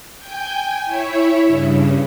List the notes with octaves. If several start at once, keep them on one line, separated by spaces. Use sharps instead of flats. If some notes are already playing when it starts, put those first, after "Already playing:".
G5 G#5 G6
E4 C#5 E5
G2 C#3